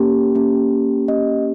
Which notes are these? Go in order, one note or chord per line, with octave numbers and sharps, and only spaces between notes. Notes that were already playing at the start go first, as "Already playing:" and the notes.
Already playing: A#3 C#4 G4
A#3 C#4 G4
A#3 C#4 G4 D#5